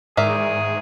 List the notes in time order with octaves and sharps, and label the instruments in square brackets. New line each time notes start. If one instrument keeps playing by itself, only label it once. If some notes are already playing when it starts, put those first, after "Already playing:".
[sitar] E2 D#3 E3 [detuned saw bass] G#2 [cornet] G#4 [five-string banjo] A#4 D5 E5